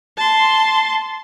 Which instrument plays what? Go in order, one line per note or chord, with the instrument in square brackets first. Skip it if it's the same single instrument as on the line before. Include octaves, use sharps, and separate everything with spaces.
[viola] A5 C6